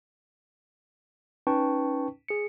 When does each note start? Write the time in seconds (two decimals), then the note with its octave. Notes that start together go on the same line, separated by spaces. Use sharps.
1.47 C#4 D#4 B4 G5 A5 C#6
2.28 G#4 C#7